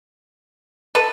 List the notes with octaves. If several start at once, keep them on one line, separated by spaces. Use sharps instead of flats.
A4 B4